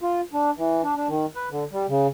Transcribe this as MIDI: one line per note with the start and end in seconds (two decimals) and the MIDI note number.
0.02 0.21 65
0.33 0.50 62
0.57 0.82 52
0.84 0.95 62
0.96 1.08 62
1.08 1.26 51
1.35 1.49 71
1.51 1.64 50
1.72 1.86 55
1.89 2.07 49